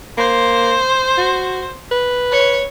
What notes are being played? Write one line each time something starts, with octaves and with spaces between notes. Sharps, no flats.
A#3 C5
F#4
B4
C#5